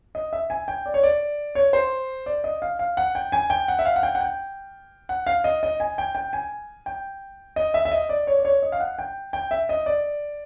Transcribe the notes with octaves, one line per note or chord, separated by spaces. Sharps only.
D#5
E5
G#5
G5
D5
C#5
D5
C#5
C5
D5
D#5
F5
F5
F#5
G5
G#5
G5
F#5
E5
F5
F#5
G5
F#5
G5
F#5
F5
D#5
D#5
G#5
G5
G5
G#5
G5
D#5
E5
E5
D#5
D5
C#5
D5
C#5
D#5
F5
F#5
G5
G5
E5
D#5
D5